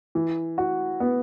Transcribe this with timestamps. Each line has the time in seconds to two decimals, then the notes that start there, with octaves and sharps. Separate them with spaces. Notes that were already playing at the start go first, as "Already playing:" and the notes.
0.15 E3
0.58 F#4
1.00 B3